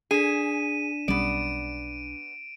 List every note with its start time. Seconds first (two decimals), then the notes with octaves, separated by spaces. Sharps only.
0.11 D4 G#4 B6 D#7 E7
1.08 B1 G3 B3 C#4 D5 D7